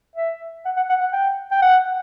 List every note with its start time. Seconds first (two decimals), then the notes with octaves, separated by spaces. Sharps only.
0.16 E5
0.65 F#5
0.77 F#5
0.90 F#5
1.01 F#5
1.13 G5
1.52 G5
1.62 F#5